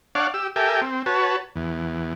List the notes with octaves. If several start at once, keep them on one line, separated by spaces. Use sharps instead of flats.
D4 C#5 D5 F5 F#5
G4 E6
G4 A4 A#4 E5 G5 G#5
C4
F#4 B4 C#5 A5
E2